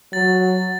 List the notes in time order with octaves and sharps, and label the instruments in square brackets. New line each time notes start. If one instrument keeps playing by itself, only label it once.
[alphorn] F#3 [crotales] A6